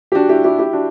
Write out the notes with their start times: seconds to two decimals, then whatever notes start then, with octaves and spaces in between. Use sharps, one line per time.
0.12 G4
0.15 D4 F#4
0.29 E4 G4
0.44 E4 G4
0.59 E4 G4
0.73 D4 F#4